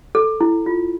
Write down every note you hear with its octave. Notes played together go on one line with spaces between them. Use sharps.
A4
E4
F4